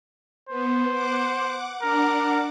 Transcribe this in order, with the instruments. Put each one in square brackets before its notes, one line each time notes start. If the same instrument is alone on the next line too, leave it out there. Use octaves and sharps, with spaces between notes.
[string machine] B3 [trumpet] C5
[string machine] F#5 D6
[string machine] D4 F#5 D6 [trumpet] A#4